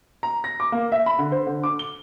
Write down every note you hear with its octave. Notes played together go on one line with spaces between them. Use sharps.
A#5
A#6
D6
A#3
E5
B5
D3
C5
D3
D6
G7